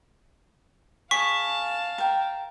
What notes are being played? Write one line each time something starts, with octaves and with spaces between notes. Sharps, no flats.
G#4 F5 A5 C#6 B6
A#4 G5